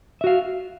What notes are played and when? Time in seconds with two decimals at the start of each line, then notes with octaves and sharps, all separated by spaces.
0.21 E5
0.24 F#4
0.27 F5